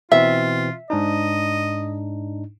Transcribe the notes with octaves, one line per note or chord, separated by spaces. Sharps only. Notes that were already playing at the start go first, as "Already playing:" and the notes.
B2 E3 C4 F4 E5
G#2 D4 D#4 D#5